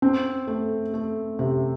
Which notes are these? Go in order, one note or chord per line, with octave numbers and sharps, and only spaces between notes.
C4
A3
A3
C3